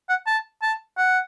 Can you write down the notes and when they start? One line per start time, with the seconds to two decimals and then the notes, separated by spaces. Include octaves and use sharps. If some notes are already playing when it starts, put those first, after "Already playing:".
0.09 F#5
0.27 A5
0.62 A5
0.97 F#5